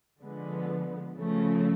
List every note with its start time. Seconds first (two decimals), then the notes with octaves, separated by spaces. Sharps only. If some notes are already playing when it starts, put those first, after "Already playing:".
0.21 D3 F3 G#3 B3
1.16 C#3 F3 A3